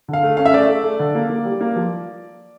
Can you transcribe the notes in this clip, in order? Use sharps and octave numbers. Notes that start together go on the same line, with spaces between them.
D3
F5
A3
C#4 F5
E5
A3 D5
A3
A3
D3
A#3
A#3
G3
A#3
F3